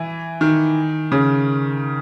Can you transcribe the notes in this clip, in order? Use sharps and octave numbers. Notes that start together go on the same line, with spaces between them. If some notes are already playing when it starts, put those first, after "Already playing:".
Already playing: E3
D#3
C#3